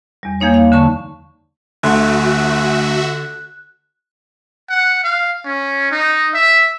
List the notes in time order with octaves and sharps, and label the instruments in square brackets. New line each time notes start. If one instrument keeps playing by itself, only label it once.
[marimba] E2 G3
E2 F3 A#3 D#4 C#5
F5
D3 A5 C#6
[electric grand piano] D2 A3 C6 [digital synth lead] D3 [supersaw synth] F#4 E5 [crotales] F#6
[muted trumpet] F#5
F5
C#4
D#4
E5